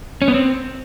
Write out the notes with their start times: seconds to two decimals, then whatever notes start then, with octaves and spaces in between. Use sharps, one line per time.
0.22 C#4
0.28 B3
0.34 C4